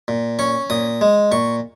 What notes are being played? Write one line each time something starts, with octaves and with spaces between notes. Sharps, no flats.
A#2
C#4 C#6
A#2 D#6
G#3
A#2 C#6